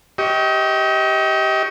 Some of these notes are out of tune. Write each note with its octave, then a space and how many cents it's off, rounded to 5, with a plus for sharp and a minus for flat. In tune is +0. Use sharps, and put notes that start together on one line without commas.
G4 -15 D#5 +35 C#6 +0